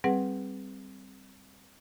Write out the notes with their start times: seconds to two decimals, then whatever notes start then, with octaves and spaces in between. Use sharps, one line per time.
0.04 G3 C4 G#4 B4 F#5